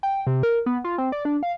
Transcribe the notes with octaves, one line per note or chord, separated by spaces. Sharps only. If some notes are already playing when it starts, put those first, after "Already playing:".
G5
C3
A#4
B3
F4
C4
D5
D4
F5